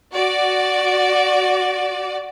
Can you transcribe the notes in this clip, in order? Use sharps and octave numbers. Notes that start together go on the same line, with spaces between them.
F#4 D5